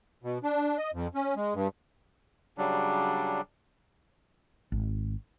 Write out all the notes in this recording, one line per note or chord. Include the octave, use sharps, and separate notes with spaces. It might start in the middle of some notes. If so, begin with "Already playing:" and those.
B2
D4
D#5
F2
C#4
G#3
G2
C#3 F#3 G3 D4
G#1